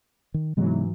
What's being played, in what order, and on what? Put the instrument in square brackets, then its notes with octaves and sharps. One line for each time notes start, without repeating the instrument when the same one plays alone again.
[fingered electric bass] D#3
[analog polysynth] G#2 E3 F#3 [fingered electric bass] C3 G#3 B3